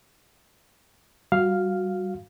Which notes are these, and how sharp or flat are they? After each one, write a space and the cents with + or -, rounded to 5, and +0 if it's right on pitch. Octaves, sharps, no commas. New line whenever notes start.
G3 -20 F#4 -15 F5 +0